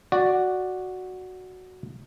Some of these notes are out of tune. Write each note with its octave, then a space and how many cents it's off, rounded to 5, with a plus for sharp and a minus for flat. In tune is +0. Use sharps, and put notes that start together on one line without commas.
F#4 +0 D5 +0